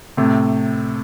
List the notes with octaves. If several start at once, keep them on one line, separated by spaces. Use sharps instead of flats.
A2 C3